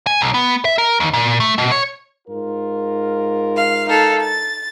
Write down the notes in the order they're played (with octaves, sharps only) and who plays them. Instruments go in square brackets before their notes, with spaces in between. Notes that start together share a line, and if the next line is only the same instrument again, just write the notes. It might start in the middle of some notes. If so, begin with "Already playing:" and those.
[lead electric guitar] G#5
B1
B3
E5
A#4
D#2
A#2
A3
B2
C#5
[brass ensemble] G#2 F4 A#4
[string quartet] F5
D#4 A4 F5
A6